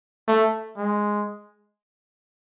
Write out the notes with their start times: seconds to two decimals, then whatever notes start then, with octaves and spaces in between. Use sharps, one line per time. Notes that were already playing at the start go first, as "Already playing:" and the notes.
0.28 A3
0.77 G#3